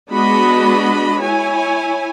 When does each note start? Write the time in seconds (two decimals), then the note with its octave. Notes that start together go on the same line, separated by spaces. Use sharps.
0.10 G#3 B3 D4 F#4 D#5 B5
1.21 E4 C#5 G#5